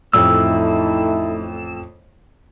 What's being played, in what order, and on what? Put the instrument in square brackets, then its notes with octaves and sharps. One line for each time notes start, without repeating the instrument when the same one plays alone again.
[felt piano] A1 F2 [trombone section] A3 D#4 E4 [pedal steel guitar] E6